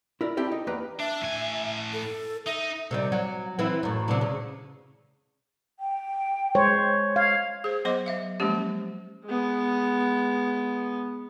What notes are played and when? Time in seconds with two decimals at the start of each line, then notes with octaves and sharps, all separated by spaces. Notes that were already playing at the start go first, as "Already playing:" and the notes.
0.21 E4 A#4 D5
0.37 C4 E4 G4 A4 A#4
0.52 D#4
0.67 E2 A#3 G4 B4 A#5
1.00 D4 E5
1.23 A2 G#5
1.93 A4
2.46 D#4 D#5 E5
2.91 C3 D#3 G3
3.12 F#3
3.59 E3 C4 E4
3.83 F#2 A2
4.08 C3 E3 D4
4.21 C#3
5.80 G5
6.55 G#3 C5 C#5
7.16 F5 G#6
7.64 G#4 C5
7.85 F#3 B3 C5 D#5 C6 D6
8.06 F#3 E5 F5
8.40 F3 F#3 G#3 A#3 C#4 G4
9.25 G#3 B3